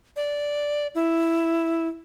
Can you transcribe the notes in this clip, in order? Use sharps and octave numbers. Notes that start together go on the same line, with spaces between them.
D5
E4